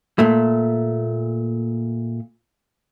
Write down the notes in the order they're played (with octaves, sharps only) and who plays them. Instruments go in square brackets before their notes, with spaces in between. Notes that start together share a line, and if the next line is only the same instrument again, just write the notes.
[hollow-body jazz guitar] A#2 A3